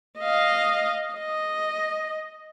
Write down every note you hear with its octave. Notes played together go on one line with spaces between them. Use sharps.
D#5 F5
D#5